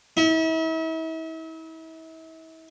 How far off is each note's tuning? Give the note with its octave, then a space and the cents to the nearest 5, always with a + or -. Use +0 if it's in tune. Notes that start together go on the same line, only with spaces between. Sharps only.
E4 -40